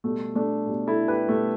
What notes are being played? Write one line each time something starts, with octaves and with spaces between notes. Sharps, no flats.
B2 G3 A3
A3 D4
B2 G3
E4 A4
G4 B4
B2 G3 A3